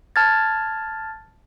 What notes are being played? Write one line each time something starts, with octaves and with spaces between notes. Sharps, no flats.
A5 F6 G#6 A6